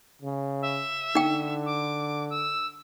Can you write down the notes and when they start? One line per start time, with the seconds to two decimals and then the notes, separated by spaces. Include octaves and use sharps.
0.22 C#3
0.62 E5
1.15 D3 D#4 G5
1.66 D6
2.30 E6